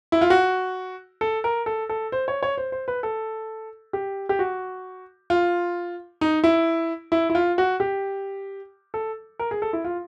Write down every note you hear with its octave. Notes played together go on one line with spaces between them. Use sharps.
E4
F4
F#4
A4
A#4
A4
A4
C5
C#5
C#5
C5
C5
B4
A4
G4
G4
F#4
F4
D#4
E4
E4
E4
F4
F#4
G4
A4
A#4
G#4
A4
E4
F4